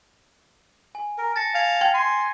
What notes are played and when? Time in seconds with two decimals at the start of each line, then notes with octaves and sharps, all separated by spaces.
0.95 G#5
1.18 A#4
1.36 A5 A6 A#6 C#7
1.54 F5 G#5 G#6 A6
1.81 G5 G#6
1.94 G#5 C6